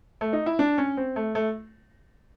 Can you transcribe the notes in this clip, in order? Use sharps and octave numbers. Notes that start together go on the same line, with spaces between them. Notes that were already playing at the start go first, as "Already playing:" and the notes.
A3
D#4
E4
D4
C#4
C4
A3
A3